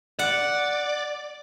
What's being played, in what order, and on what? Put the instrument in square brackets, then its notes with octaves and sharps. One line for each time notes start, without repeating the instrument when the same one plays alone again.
[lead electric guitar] D5 [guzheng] F#5